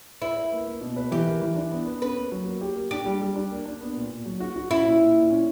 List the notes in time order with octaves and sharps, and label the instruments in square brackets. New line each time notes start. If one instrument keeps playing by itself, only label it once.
[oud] E4 [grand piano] B4
[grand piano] B4
A#3
A#3
B2
B4
[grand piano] E3 [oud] G4
[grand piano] A#4
E3
D4
B3
B3
[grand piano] C#4 [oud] B4
[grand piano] A#3
F#3
A#3
G4
A#3
[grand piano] D4 [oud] G4
[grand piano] G3
G3
D4
A#3
D4
B3
A#2
A#2
F#3
F#4
F#4
[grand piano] C#4 [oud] E4
[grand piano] A#2
A#2
A#2
C#4